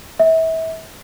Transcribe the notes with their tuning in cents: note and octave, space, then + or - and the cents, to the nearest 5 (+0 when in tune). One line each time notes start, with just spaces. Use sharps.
E5 -30